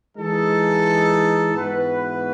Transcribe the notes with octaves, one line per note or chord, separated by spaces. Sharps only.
E3 G#3 D#4 A4
G#2 E3 B3 F#4 B4